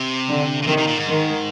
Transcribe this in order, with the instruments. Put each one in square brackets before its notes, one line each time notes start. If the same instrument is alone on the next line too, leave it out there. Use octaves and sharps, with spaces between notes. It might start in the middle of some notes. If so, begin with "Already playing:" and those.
Already playing: [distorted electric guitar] C3
[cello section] D3
[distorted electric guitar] A#2
[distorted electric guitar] C3 [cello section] D#3
[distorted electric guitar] C3
A#2
G#2
[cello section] D#3